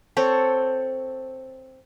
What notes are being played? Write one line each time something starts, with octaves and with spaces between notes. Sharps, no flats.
C4 A4 C#5